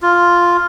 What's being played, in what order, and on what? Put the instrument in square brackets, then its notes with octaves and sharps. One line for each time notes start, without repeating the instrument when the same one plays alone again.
[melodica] F4